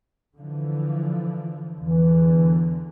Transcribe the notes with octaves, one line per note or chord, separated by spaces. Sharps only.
D3 E3 F3
E2 D3 E3